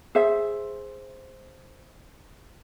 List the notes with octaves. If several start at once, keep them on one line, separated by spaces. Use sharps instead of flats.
G#4 C5 E5